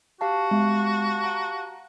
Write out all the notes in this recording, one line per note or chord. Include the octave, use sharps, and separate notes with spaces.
F#4 G4 F5 A5
G#3
F#5 A#5